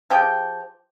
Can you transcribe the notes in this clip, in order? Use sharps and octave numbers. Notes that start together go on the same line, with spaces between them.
F3 G4 G#4 G5